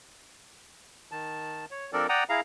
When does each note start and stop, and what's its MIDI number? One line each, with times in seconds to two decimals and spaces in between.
1.12 1.65 51
1.12 1.65 81
1.71 1.91 73
1.93 2.07 53
1.93 2.07 60
1.93 2.07 62
1.93 2.07 69
1.93 2.07 70
1.93 2.07 74
2.09 2.24 74
2.09 2.24 78
2.09 2.24 79
2.09 2.24 82
2.09 2.24 87
2.29 2.41 64
2.29 2.41 68
2.29 2.41 77
2.29 2.41 82